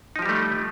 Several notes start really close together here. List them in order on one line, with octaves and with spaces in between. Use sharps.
D#4 F3 G4 G3 A3